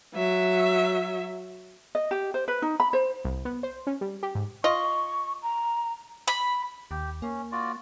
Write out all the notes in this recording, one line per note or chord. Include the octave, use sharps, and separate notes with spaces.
F#3 E5
D#5
G4
C5
B4
D#4
B5
C5
C2
B3
C5
C#4
G3
G4
G#2
F4 D#5 C#6
A#5
B5
D#2 G4
A#3 C#4
F4 F#4 D5